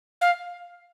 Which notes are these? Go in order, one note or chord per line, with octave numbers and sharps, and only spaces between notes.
F5